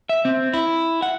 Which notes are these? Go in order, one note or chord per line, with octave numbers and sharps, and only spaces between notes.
E5
C4
E4
F#5